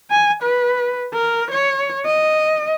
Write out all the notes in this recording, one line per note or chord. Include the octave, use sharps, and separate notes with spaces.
G#5
B4
A#4
C#5
D#5